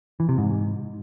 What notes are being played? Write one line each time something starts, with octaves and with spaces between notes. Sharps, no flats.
E3
C3
G#2